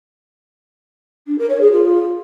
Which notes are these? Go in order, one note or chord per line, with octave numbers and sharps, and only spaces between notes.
D4
A#4
C#5
G#4
F4